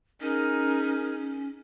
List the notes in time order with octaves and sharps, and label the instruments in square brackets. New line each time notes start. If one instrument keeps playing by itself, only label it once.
[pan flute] C#4 [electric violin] D#4 G#4 [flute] A#4